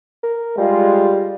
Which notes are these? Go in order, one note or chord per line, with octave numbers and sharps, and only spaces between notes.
A#4
G3 G#3 F4